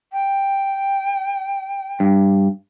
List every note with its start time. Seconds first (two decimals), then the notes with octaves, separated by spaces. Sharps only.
0.12 G5
2.00 G2